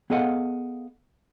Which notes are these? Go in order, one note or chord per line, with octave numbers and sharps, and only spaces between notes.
B3 G#4 A4 D#5 F5 F#5